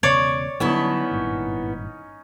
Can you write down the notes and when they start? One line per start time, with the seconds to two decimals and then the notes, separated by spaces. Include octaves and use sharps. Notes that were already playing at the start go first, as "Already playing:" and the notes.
0.03 E1 C#3 B3 C#5 D5 C#6
0.60 D3 F#3 G3 B3 C#4 D#4 E4 A5
1.11 G#1 G2 A#2